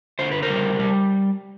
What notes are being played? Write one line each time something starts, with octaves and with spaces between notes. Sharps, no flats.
D3 C5
B4
A#4 C5
G3
G3